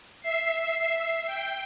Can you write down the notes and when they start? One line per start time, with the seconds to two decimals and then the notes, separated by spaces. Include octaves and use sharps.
0.21 E5 C7
1.26 G5